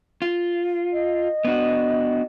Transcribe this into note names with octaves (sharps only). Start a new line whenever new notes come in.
F4
D#5
B3 D4 F#4